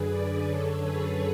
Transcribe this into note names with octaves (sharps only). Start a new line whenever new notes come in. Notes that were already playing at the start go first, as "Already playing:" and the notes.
Already playing: F#2 D3 G#4 B4
B4 D5
F#2 D3 A4 C#5
G#4 B4